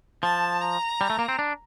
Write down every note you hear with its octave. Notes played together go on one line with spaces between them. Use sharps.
F3 A5
A#5
G3
A3
A#3
C4
D4